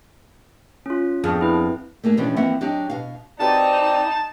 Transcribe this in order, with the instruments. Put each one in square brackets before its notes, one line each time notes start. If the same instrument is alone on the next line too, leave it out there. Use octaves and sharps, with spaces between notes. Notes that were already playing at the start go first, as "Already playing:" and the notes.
[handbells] C#4 F4
[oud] F2 [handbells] B3 D4 G#4
[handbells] E4 B4
[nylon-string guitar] A3 A#3 D4 G#4
B2 E3 F3 G3 C#4 D4
E3 F3 A#3 C4 E5 F#5
F#3 D4 D#4 G4
B2 F5
[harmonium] C4 D5 [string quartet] D#4 [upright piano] F#4 G4 B4 [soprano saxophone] A5